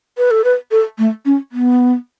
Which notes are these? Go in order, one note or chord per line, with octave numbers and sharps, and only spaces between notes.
B4
A4
B4
A4
A3
C#4
B3